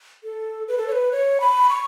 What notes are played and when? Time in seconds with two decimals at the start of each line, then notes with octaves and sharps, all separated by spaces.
0.24 A4
0.68 B4
0.78 A4
0.87 C#5
0.92 B4
1.12 C#5
1.40 B5
1.69 C#6